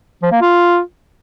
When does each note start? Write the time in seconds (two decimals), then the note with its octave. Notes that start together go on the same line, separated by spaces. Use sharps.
0.23 F3
0.32 A#3
0.41 F4